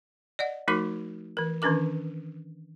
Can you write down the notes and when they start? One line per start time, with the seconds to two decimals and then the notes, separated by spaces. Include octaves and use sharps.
0.39 D5 D#5 F#5
0.68 F3 A3 D#4 F#4 A#4 D6
1.37 E3 A#4
1.62 D#3 E3 C#4 D4 A#4 D6